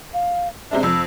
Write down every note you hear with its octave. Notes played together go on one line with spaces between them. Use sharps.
F5
C3 G#3 D4 E5
F2 E6